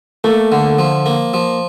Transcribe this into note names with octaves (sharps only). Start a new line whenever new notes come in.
A3 A#3 A4
D3
F3
A#3
F3